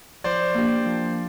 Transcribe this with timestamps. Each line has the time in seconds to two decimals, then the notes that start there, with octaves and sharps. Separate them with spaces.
0.24 F3 C5 D5
0.54 A#3 D4 G4
0.85 F3